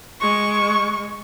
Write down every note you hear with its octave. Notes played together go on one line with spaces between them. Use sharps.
G#3 C#6